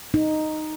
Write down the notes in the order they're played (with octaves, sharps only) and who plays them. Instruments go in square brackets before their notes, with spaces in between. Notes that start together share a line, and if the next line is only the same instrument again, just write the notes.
[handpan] D#4